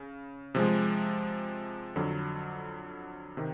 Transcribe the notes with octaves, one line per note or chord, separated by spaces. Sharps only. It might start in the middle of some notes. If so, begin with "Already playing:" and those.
Already playing: C#3
C3 F3 G#3
F2 D3 F#3
C3 D#3